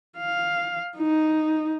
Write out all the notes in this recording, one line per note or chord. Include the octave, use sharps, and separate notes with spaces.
F5
D#4